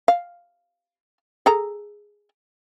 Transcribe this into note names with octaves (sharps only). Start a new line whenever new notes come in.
F5
G#4 A4 A#5